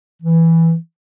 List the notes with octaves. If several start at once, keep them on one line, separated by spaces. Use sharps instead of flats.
E3